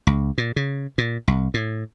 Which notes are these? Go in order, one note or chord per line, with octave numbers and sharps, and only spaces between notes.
C#2
A#2
C#3
A#2
C2
A2